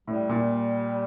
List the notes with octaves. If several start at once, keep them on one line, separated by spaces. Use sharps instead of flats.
A2 G3
A#2